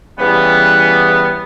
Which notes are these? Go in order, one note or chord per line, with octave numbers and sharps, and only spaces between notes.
C#3 E3 G3 B3